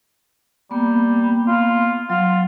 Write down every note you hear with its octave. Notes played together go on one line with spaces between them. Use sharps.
G3 A#3 B3
F4
F#3 F4